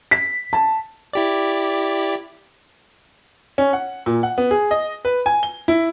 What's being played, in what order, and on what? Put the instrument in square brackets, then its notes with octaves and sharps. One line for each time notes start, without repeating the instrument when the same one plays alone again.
[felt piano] B6
A5
[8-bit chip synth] E4 G4 D5
[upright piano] C#4
F#5
A#2
F#5
B3
G#4
D#5
B4
G#5
G7
E4